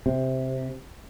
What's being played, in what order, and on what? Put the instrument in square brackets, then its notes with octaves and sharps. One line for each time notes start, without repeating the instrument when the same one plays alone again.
[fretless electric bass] C3